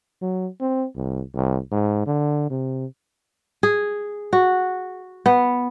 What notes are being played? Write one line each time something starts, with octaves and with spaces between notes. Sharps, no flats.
F#3
C4
C2
C2
G#2
D3
C3
G#4
F#4
B3